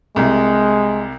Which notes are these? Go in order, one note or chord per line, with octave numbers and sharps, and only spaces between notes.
C2 C3 G#3